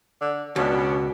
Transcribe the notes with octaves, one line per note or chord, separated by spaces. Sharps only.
D3
C#2 B2 B3 C#4 D4